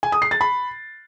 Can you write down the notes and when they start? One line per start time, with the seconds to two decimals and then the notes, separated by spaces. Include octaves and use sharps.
0.03 G#5
0.12 D#6
0.22 C7
0.31 A6
0.41 B5